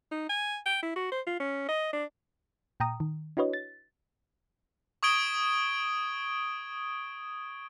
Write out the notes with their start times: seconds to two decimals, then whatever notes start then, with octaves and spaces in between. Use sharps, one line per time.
0.11 D#4
0.29 G#5
0.66 G5
0.83 E4
0.96 F#4
1.12 C5
1.26 F4
1.40 C#4
1.69 D#5
1.93 D4
2.80 A#2 G5 A#5 D#6
3.00 D#3
3.37 D4 E4 F#4 B4 C#5 D#5
3.53 A6
5.03 C#6 D#6 G#6 D7 G7